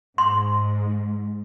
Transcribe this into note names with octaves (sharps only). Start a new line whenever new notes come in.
G#2 C6